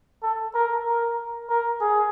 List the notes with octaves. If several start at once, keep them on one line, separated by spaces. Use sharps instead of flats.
A4
A#4
A#4
A#4
G#4